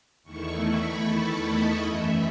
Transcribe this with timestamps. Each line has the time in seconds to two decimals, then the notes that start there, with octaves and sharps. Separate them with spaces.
0.23 E2 D#3 A3 E4 C#6
0.64 B5
1.03 A5
1.43 D#5
1.82 F#2 E3 A3 E5